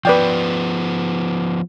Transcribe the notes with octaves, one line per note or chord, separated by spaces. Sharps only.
F3 B3 B4 D5 G5